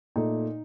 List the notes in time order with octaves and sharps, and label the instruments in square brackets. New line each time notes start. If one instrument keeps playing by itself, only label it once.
[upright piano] A#2 A3 D#4